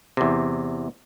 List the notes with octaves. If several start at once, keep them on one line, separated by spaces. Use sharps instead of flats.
E2 C3